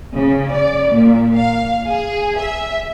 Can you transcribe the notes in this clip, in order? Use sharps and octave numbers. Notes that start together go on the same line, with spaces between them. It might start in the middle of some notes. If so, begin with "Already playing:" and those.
C#3
D5
A#2
F5
G#4
E5